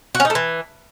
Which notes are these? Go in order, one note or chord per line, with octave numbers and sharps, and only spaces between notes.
F#4
C#4
D#4
A3
E3